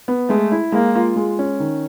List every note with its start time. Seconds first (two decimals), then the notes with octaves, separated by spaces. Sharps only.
0.08 B3
0.29 G#3 A3
0.52 E4
0.72 G#3 A#3
0.95 F4
1.16 G#3
1.39 C#4
1.60 D#3